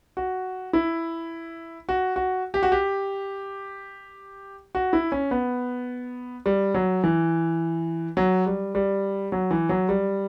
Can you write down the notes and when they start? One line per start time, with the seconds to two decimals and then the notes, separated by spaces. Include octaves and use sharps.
0.17 F#4
0.73 E4
1.89 F#4
2.16 F#4
2.54 G4
2.63 F#4
2.72 G4
4.75 F#4
4.93 E4
5.12 C#4
5.31 B3
6.46 G3
6.74 F#3
7.04 E3
8.17 F#3
8.46 G3
8.75 G3
9.32 F#3
9.51 E3
9.69 F#3
9.89 G3